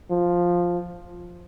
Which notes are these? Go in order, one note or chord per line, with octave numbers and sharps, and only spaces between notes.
F3